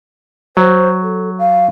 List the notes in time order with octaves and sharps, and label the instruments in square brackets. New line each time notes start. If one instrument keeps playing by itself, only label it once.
[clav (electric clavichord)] F#3 [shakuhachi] C5
[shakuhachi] A4
F5